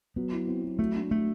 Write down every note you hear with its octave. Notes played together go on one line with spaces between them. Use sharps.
F#3 B3
E4
C4
F#3
A3 F#4
D4
A3 F#4